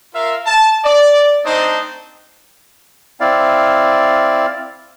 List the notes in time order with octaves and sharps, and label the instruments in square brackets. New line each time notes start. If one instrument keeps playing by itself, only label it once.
[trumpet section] F4 A#4 E5 F5
A5
D5
A3 C4 D4 D#4 C5 D#5
[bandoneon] C4 E4 D5 F5